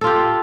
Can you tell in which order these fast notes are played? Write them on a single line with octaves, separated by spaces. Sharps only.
A4 F4 G4